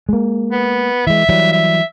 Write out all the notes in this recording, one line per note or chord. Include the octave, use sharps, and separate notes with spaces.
G#3 A#3
B3
E3 G#3 E5
E3 F#3 G3
E5